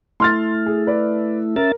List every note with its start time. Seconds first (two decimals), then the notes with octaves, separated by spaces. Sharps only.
0.20 A3 E4 C6 F6 A6
0.66 G#4
0.87 B4 D5
1.56 C#4 A#4 E5 A6